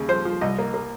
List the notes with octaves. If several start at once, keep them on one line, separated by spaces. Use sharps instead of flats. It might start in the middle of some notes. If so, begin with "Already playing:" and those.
Already playing: D#2 C#3
F3 C5
F3
C2 D#5
A#3
A#3